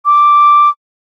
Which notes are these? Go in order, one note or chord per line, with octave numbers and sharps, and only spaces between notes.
D6